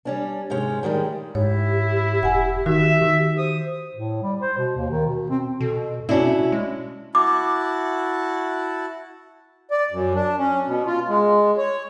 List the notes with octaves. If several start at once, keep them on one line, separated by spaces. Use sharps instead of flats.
G3 C#4 D4
G#2 C3 G#3 C#4
A2 D#3 G3 G#3
G#2 E4 G4 C#5
E1 F#5 G#5
D#3 F#4 E5
D#3
C5 D#6
A2
G3
C5
B2
D#2
D#3
B2
C4
B2 A4
B2 C#4 D4 E4 F#4
G#3
E4 F#4 A5 D6
D5
F#2
D4
C#4
B2
F4
G#3
C#5